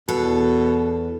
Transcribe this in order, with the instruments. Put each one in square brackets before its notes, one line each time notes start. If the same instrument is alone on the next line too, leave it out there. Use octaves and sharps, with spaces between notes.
[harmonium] E2 [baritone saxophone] B2 [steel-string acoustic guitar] A4